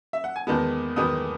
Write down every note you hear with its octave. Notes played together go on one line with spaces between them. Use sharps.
E5
F#5
G#5
E2 D#3 G#3 B3 A5
E2 D#3 G#3 B3 D#6